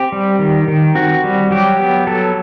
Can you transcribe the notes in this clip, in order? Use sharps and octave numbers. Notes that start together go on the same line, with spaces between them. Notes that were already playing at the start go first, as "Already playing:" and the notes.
Already playing: C4 G4
G3
D#3
D#3
C4 F#4
G3
F#3 G4
B3
F#3 A4